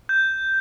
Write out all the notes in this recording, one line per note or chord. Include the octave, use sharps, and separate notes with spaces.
G6